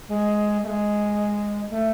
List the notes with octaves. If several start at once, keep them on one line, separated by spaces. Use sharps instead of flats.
G#3
A3
G#3
A3